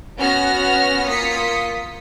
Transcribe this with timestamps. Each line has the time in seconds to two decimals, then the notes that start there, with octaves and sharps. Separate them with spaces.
0.17 B3 C#4 F#4 F6 A#6
1.07 A#3 F4 D#6 B6 C#7